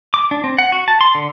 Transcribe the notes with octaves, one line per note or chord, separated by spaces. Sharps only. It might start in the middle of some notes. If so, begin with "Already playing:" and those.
D6
D4
C4
F#5
F#4
A5
C6
D3